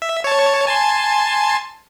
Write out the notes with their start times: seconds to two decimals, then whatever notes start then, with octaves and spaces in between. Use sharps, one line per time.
0.02 E5
0.24 C#5 A5
0.67 G#5 A5 C6